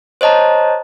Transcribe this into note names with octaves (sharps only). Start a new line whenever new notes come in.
C5 C#5 D#5 A5 A#5